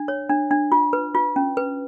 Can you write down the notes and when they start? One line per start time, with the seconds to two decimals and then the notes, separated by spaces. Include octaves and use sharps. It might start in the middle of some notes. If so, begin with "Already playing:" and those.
Already playing: D4
0.08 C#5
0.30 D4
0.51 D4
0.72 F4
0.93 B4
1.15 F4
1.36 C#4
1.57 B4